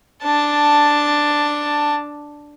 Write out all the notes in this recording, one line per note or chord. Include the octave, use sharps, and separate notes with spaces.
D4 A5